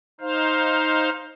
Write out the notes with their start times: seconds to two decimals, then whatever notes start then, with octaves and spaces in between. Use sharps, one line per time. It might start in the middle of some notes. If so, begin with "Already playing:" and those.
0.21 D#4 C5 F5